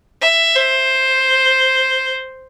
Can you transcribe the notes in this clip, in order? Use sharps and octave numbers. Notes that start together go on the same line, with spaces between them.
E5
C5